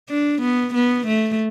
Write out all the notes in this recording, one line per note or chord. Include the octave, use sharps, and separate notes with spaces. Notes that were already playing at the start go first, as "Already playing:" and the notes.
D4
B3
B3
A3